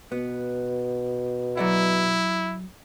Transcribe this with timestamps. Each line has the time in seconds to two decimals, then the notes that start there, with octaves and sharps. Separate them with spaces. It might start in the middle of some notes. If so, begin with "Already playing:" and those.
0.12 B2 B3
1.57 F#3 E4 D5 F#5